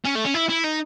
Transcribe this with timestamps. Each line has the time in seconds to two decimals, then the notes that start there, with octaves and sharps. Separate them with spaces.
0.05 C#4
0.15 A3
0.25 C#4
0.35 E4
0.49 E4
0.64 D#4